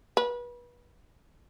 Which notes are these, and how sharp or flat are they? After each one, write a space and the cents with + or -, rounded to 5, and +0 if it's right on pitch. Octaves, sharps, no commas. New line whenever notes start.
B4 -30